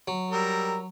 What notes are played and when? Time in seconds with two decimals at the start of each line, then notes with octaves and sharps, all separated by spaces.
0.08 F#3
0.31 G3 A#4 E6